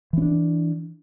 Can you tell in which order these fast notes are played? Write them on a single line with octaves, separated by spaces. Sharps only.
E3 C#4 D4